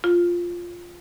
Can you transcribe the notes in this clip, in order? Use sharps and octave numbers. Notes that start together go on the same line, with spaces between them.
F4